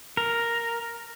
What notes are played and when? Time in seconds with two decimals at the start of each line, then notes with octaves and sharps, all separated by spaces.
0.17 A#4